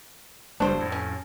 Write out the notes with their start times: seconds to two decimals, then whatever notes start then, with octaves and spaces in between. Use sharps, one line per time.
0.60 F#1 G3 A3 D4 C5
0.78 F2 A2
0.92 C#4